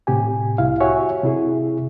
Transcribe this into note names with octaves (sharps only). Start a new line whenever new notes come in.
A2 C3 G4 G#5
C2 E4 F5
F#4 G4 C#5 E5 F#5 G#5
C3 E4 G#4